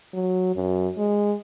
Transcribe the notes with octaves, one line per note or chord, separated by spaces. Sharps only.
F#3
F#2
G#3